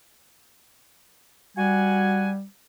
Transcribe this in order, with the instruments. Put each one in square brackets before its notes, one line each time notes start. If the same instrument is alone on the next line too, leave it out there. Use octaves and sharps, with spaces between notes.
[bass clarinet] G3 [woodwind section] F#4 F#5 G#5